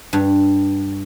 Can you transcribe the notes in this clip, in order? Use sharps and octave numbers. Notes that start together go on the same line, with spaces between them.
G2